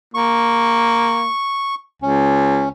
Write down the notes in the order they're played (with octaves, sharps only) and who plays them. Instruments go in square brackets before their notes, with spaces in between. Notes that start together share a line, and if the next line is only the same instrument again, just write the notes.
[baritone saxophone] A#3 [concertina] C#6
[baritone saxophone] C#2 [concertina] C#4